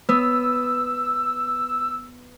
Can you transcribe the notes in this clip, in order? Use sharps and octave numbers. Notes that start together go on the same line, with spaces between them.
B3 E6